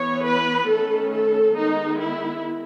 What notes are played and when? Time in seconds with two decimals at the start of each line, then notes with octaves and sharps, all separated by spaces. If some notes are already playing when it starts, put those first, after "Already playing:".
Already playing: E3 B3 C#5
0.25 B4
0.69 D#3 A3 C#4 A4
1.13 A4
1.57 D#3 G#3 B3 D#4
2.01 E4